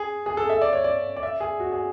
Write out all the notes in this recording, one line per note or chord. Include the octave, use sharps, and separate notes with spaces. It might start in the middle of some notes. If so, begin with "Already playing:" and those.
Already playing: G#4
G#4
A4
E5
D5
C#5
D5
D5
E5
G#4
F#4
G#4